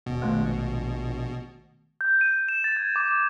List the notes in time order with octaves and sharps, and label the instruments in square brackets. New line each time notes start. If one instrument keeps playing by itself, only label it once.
[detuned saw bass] D#1 [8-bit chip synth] B2
[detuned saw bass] A#1 [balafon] D#3 G#3 A3
[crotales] G6
D#7
E7
A6
G#6
D6